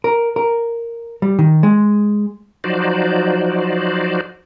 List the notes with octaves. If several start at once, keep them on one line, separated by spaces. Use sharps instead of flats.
A#4
A#4
G3
D#3
G#3
F3 F#3 D#4 F#4 C5 D5